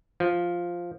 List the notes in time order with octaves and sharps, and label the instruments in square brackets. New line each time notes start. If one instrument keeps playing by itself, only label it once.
[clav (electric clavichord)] F3